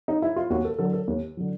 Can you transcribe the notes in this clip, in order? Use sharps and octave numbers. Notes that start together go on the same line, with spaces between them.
D#4
E4
F4
D#2 F#4
A4
D3 F#3 A4
A4
D#2
D3 F#3